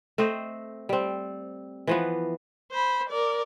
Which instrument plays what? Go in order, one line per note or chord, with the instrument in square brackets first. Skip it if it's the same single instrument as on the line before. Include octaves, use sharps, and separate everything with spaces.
[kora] A3 C4 C5 D#5
G3 C4
E3 F3 B3
[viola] C5 B5
A#4 D5